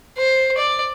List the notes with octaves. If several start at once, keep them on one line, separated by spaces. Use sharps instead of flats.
C5
D5